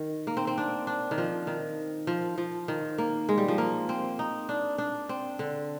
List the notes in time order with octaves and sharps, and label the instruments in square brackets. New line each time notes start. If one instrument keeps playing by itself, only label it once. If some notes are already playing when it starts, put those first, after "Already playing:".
Already playing: [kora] D#3
A#3
C4
C4
D4
D4
D#3
F3
D#3
F3
F3
D#3
A#3
G#3
G3
F3
A#3
C4
D#4
D4
D4
C4
D3